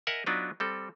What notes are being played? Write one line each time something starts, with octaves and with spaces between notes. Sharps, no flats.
A#4 D#5 E5 F#5 G#5
F#3 B3 D4 D#4 F4 B4
G3 C4 A4